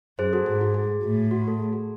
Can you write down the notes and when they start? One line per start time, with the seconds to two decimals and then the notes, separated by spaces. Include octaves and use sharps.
0.19 F#2 G#4 C5
0.33 F#4 A4
0.46 G#2 G#4
0.61 F#4
0.74 G#4
1.03 A2
1.31 F#4
1.48 A4
1.60 G#4
1.73 F#4 A4